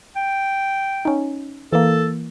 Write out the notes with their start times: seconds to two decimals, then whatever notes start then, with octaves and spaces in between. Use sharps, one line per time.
0.16 G5
1.05 C#4 D#4
1.73 E3 A#3 A4